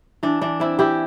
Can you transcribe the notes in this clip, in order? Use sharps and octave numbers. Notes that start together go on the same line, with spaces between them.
E3 D4
E3 D4
C4 E4
E3 E4 G4